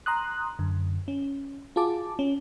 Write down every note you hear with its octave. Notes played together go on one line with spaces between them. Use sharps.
A#5 C6 D#6 F#6
F#2 D3
C#4
F4 F#4 G#4 A5 D6
C#4